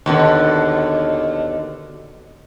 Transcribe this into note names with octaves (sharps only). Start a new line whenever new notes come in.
D#2 B2 D3